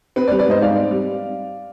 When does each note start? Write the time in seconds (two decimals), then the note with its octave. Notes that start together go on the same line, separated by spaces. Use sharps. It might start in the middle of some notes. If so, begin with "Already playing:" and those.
0.16 C4 B4
0.28 B4 D5
0.31 G3
0.39 B4 D5
0.47 G#2 C5 D#5
0.61 G#2 D5 F5
0.76 C4
0.91 G3